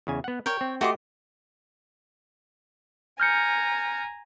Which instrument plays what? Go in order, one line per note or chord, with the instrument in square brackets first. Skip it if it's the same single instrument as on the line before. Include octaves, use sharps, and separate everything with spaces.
[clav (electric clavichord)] E2 C#3 G#5
B3 F#5
[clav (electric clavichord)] A#4 [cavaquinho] C#5 G5
[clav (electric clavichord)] C4
[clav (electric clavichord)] A3 G4 D#5 [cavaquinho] F#4 C6 D6
[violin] G#5 A#5 [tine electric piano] F6 G6 C#7